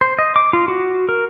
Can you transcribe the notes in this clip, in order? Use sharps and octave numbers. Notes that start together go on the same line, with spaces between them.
C5
D#5
D6
F4
F#4
A#4